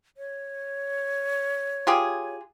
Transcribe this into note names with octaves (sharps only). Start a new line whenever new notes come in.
C#5
F4 G4 G#4